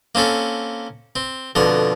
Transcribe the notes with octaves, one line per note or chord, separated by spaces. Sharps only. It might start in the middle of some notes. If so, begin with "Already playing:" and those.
A#3 C4 C#4 A4
C4
F2 B2 D3 A#4